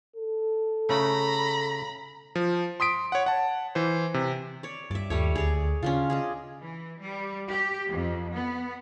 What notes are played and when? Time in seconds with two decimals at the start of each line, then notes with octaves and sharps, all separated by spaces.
0.16 A4
0.89 C#3 A3 A#5 B5
2.36 F3
2.80 C6 D#6 B6 D7
3.12 C#5 F#5
3.26 F#5 A5
3.75 E3 C5
4.14 C3
4.63 C#5 D5
4.91 G2 D5 E5
5.10 D#2 G3 A3 C#5
5.35 D2 G#4 C#5 D5
5.83 C#3 C#4 D4 F4
6.10 G#4 D5 D#5
6.60 E3
7.00 G3
7.47 G4
7.89 F2
8.35 B3